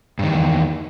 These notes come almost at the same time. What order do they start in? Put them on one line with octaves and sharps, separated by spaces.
G2 D#3 E2